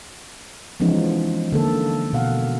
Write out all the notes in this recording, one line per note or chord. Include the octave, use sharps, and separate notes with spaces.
E3 F3 G#3 B3 C#4 D#4
D3 A#3 A4
B2 F5 F#5